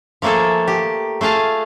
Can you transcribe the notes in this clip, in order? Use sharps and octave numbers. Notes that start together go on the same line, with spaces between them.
F3 A3 A#3 G#4 A4
G4
A3 F4 G#4 F5 A5